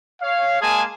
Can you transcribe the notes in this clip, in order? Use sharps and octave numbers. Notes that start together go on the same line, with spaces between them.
C#5 F5
G#3 A#3 G#4 G#5 A5